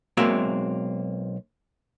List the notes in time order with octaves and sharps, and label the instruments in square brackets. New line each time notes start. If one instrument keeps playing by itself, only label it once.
[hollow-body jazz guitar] B1 G#3 A#3 C4 F#4 E5